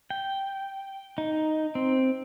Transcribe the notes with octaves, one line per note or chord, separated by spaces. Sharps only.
G5
D#4
C4